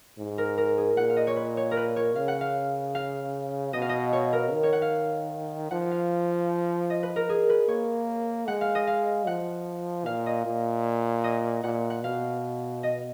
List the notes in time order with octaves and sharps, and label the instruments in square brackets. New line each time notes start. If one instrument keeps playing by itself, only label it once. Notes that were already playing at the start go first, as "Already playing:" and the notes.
[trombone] G#2
[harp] A#4
A#4
G#4
[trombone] A#2 [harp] F#5
[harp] F5
D#5
C#5
B4
C#5
A#4
B4
C#5
[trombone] C#3 [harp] F5
[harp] F#5
F5
F5
[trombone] B2 [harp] D#5
[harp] F5
D#5
C#5
A#4
[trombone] D#3
[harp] C#5
F#5
F5
[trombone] F3 [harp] F#5
[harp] F5
D#5
B4
A#4
G#4
B4
[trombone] A#3 [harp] C#5
[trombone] G#3 [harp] F#5
[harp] F5
D#5
F5
[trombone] F3 [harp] F#5
[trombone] A#2 [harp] F5
[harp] D#5
[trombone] A#2
[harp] D#5
[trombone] A#2 [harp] F#5
[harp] F#5
[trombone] B2 [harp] F5
[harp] D#5